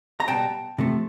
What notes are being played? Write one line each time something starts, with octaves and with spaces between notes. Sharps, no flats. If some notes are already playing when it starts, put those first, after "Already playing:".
A#5
B2 G3 B3 G5 A5
C3 F3 A3